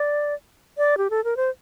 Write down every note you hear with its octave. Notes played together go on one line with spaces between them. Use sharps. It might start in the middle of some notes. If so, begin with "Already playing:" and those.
Already playing: D5
D5
G4
A4
A#4
C5